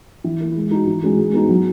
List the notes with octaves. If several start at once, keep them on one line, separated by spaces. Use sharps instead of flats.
E3
A#3 E4
G#3
D#4 F#4
E3
G#3 C#4 F#4
G#3
B3 D#4 F#4
F#3